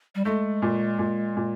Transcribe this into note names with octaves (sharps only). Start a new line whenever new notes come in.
G3
G#3 A3
A#2
A#2
A#2